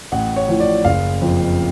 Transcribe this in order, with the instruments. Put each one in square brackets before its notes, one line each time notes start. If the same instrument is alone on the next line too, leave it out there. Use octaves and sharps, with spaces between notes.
[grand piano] A1 F#5
C#5
A2 F3
D5
F#1 F5
F2 F3